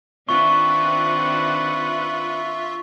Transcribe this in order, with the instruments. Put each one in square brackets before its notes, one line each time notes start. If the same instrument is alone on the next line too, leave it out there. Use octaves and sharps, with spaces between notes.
[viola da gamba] D#3 C4 D4 [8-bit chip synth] F4 E5 [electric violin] B4 F#5 [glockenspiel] C#6